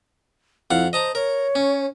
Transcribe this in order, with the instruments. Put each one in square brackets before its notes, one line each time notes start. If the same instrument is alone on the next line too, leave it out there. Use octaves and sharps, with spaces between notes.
[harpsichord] F2 F5 F#5 [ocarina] E4
[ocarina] C5 [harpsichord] D#5 A5 A#5
[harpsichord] A#4 [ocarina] C#5
[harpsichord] C#4